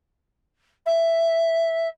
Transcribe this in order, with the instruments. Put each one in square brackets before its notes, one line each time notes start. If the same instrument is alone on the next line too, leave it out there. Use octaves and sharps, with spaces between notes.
[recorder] E5